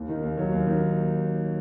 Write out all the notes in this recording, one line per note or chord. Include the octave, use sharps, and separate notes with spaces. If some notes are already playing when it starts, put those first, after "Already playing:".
Already playing: D#2
D#3
D#2
F#3
D#2
D#3